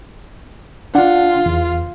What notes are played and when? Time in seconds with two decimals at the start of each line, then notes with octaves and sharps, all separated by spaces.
0.95 D4 F4 F#5
1.46 E2